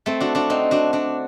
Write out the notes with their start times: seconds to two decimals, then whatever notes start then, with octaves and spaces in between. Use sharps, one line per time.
0.06 A3 C4
0.20 D4 F#4
0.35 D4 F#4
0.50 C4 D#4
0.71 D4 F#4
0.93 D4 F#4